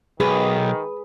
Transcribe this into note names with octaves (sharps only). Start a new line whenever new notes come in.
B1 D#3 G#4 B4